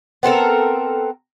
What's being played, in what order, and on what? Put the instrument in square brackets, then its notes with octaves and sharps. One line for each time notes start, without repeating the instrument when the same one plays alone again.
[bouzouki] B3 C4 A4 A#4